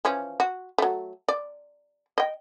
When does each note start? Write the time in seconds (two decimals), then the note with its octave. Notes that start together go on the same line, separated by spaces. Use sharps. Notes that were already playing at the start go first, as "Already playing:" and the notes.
0.05 E3 F3 C#4
0.40 F#4
0.78 F#3 A3
1.28 D5
2.18 D#5 G5